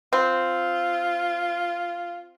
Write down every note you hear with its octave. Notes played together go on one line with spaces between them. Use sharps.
C4 F4